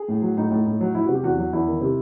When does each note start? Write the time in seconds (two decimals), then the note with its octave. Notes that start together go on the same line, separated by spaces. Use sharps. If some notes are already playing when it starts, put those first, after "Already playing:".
Already playing: G#4
0.08 A2
0.22 F#3
0.37 A2 D#4
0.51 A2
0.66 A2
0.81 F#3
0.95 F#3 E4
1.04 F#4
1.09 C3
1.15 G4
1.23 E2 F#4
1.38 F#3
1.53 E2 E4
1.67 D#3
1.81 C3